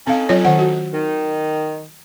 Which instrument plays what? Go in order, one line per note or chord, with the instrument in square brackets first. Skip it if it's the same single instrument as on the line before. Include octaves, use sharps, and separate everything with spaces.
[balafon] C4 F5 [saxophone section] C#4 D#4 A4
[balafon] F#3 F4 C#5
D#3 F#5
F#4
[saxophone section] D#3